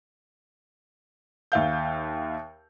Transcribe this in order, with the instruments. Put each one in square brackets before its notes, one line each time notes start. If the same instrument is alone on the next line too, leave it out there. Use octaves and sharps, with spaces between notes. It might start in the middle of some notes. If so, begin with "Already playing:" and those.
[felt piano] D#2 E5 F5 G6